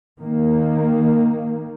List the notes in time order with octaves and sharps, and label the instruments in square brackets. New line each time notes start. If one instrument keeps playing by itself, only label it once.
[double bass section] D#3 A#3